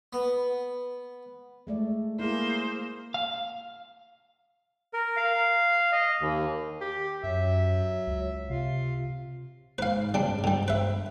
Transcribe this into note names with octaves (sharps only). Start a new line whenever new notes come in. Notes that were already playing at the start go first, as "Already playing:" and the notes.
B3
G#3 A3 D5
A#3 E4 G#4 C5
F5
A#4
F5
D#5
D#2
G4
F#2 F#3 E5
C#2
C3 F4 F5
G#2 B4 F5
C#3 G3 D4
G2
D3 G3
B4 E5